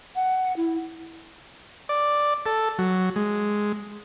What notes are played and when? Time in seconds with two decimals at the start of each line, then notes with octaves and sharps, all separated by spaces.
0.15 F#5
0.57 E4
1.89 D5
2.46 A4
2.79 F#3
3.16 G#3